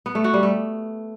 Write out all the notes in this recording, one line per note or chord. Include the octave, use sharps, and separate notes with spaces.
B3
A3
F#4
G3
A3